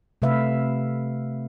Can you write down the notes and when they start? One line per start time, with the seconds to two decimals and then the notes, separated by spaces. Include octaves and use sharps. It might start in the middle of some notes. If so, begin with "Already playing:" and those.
0.22 C3 A3 B4 E5 F5